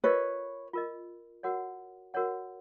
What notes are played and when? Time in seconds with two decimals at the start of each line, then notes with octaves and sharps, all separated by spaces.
0.04 F4 A#4 B4 C#5 D#5
0.73 F4 A#4 D#5
1.43 F#4 A#4 C#5 F#5
2.14 F#4 A#4 C#5 F#5